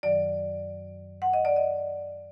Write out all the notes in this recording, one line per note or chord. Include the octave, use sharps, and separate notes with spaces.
F#2 D#3 F#3 D5
F#5
D#5
D5
D#5